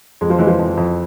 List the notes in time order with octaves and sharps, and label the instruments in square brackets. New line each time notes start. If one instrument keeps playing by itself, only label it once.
[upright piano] F2 [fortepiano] G#3
[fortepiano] F3
[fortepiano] E3 [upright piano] G#3
[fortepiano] F3
[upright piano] F2
F2